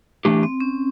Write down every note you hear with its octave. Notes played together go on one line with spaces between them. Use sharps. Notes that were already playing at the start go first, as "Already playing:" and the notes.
E3 A3 D4 G4
C4
C#4